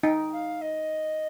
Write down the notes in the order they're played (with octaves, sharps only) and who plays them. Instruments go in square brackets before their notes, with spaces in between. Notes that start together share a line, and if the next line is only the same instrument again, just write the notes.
[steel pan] D#4 [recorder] G5
[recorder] F5
D#5